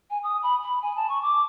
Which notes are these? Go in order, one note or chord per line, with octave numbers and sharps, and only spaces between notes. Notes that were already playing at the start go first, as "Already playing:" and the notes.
G#5
D#6
B5
B5
G#5
A5
C#6
D6